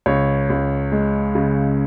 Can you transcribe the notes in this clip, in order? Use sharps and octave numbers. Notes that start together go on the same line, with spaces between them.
C#2 C#5
C#2
G#3
C#3